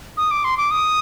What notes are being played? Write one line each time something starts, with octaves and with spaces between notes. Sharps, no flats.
D#6
D6
C6
D6
D#6